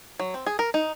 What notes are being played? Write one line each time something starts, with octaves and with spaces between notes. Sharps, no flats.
F#3
C4
G#4
A#4
D#4